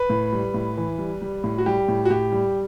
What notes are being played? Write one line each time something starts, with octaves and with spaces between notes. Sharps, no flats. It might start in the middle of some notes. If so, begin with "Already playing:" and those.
Already playing: B4
A2
G3
A2
E3
G3
G3
A2
F#4
G3 G4
A2
F#4
A2 G4
G3